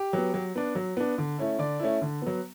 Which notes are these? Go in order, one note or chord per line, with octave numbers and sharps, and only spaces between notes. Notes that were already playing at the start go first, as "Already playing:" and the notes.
Already playing: G4
F#3 B3
F#3
B3 D4
F#3
B3 D4
D3
A3 C#4 E4
D3 D5
A3 C#4 E4
D3
F#3 B3